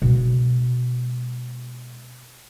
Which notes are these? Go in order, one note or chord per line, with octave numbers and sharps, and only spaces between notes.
B2 G#3